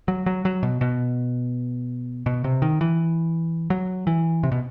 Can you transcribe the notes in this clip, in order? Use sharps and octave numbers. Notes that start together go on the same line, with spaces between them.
F#3
F#3
F#3
B2
B2
B2
C3
D#3
E3
F#3
E3
C3
B2